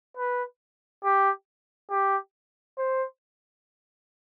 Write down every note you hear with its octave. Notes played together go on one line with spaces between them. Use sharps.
B4
G4
G4
C5